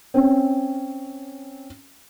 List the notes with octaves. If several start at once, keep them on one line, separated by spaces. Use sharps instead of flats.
C4 C#4